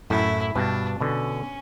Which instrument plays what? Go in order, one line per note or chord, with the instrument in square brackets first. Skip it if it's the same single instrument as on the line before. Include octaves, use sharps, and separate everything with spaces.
[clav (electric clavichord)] F#2 A2 [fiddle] E4
[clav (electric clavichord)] G2 B2 [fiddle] D4
[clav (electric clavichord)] B2 D3 [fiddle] C#4